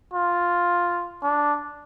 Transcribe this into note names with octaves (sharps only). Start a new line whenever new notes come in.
F4
D4